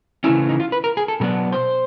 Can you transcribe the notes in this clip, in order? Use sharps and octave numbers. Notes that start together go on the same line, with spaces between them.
C#3 E3 A3 C#4 E4
D#4
F4
B4
A#4
G#4
A4
B2 F#3 B3 D4 A#4
C5